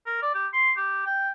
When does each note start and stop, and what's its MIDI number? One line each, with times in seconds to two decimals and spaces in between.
0.06 0.19 70
0.22 0.33 74
0.34 0.47 67
0.53 0.71 84
0.77 1.02 67
1.06 1.30 79